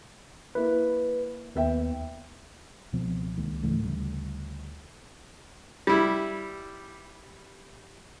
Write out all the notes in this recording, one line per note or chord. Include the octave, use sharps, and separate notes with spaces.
A#3 E4 B4
D#2 B3 E5 G5
C#2 B2 F3 C4
C#2 D#3 G#3 A#3
G#2 C#3 E3 A3
D2 C#3 G3
G3 E4